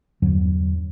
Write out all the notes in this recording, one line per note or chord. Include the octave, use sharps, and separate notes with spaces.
E2 G2 D3 F#3